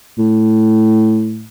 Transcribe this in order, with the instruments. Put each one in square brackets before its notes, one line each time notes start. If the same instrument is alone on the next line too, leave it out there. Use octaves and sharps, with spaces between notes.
[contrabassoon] A2